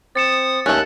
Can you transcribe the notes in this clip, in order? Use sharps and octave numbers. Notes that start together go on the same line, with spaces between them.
C4 D#6 A6 C#7 E7
D#2 A3 C#4 F#6